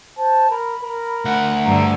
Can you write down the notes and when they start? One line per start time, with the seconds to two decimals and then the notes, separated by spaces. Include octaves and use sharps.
0.18 C5 A5
0.50 A#4 B5
0.83 A#4
1.25 D2 F#5
1.65 G2 D3 A#5